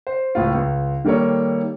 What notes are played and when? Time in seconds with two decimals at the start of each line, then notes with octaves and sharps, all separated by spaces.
0.07 C5
0.35 C#2 A2 F4
0.54 C#2
1.04 D#3 G3 A#3 A4 C#5